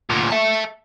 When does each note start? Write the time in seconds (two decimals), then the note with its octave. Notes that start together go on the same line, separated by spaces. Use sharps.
0.10 D2 A#2
0.31 E5 A5